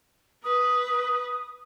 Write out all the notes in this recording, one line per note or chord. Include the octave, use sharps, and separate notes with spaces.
B4 D#6